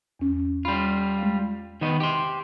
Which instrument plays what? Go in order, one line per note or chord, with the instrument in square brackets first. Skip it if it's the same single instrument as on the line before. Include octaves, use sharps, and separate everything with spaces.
[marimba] E2 C#4
[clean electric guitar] G3 F4 [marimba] B5
[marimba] G#3
[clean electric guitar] D#3 B3 D#5
G4 C6